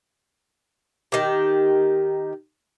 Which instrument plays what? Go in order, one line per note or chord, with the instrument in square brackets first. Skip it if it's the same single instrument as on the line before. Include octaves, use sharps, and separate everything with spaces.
[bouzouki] D#3 G4